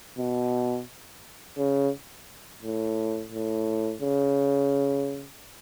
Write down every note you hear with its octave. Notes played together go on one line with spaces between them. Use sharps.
B2
C#3
A2
A2
C#3